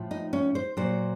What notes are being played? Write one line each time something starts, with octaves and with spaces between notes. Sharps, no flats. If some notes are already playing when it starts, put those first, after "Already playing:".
Already playing: A2 F3
D#4
C#4
C5
A#2 F#3 C5